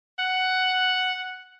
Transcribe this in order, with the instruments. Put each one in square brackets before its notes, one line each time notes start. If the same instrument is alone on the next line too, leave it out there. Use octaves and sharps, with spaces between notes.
[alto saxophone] F#5